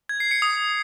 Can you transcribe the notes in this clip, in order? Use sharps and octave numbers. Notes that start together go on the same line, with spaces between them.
G#6
C7
C#7
D#6